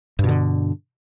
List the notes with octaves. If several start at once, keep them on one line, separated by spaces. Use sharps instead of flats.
G2 B2 D3